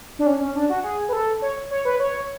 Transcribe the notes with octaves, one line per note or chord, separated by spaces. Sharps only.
D4
C#4
C#4
D4
F#4
G#4
B4
A4
C#5
C#5
B4
C#5